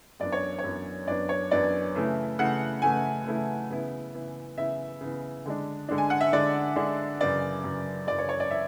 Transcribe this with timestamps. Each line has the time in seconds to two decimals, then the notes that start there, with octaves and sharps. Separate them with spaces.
0.20 F#2 E3 B3 D4 D5
0.32 C#5
0.59 C#5
0.64 F#2 E3 B3 D4
1.07 F#2 E3 B3 D4 D5
1.29 C#5
1.51 F#2 E3 B3 D4 D5
1.95 C#3 E3 A3 E4
2.39 C#3 E3 A3 E4 F#5
2.82 C#3 E3 A3 E4 G#5
3.26 C#3 E3 A3 E4
3.70 C#3 E3 B3 E4
4.13 C#3 E3 B3 E4
4.57 C#3 E3 B3 E4 E5
5.01 C#3 E3 B3 E4
5.46 D3 G#3 D4
5.89 D3 G#3 D4
5.98 G#5
6.10 F#5
6.21 E5
6.33 D3 G#3 D4 D5
6.76 D3 G#3 D4
7.21 F#2 C#3 E3 D5
7.63 F#2 C#3 E3
8.07 F#2 C#3 E3 D5
8.19 C#5
8.29 C#5
8.40 D5
8.51 E3 E5